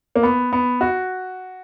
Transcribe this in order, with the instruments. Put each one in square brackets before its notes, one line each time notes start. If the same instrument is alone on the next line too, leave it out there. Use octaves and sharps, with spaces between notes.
[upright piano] A#3
B3
B3
F#4